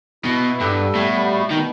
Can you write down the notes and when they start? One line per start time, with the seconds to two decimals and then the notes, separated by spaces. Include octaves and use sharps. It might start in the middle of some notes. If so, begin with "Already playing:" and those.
0.25 B2 E4
0.42 B3
0.60 G2 A4
0.78 G3
0.95 A2 B3
1.12 G3
1.31 B2
1.48 B2 D#3